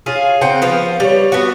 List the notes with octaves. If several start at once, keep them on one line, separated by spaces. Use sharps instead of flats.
C#4 F4 G#4
C#3 C4 F#5 G5
F3 B3
G3 C#5
B3 F#4